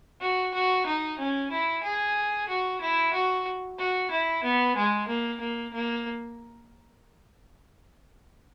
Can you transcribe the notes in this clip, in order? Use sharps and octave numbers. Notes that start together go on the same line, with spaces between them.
F#4
F#4
D#4
C#4
E4
G#4
F#4
E4
F#4
F#4
E4
B3
G#3
A#3
A#3
A#3